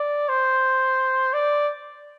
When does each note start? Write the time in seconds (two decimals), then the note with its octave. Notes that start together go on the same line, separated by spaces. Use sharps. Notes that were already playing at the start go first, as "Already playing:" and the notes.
Already playing: D5
0.29 C5
1.34 D5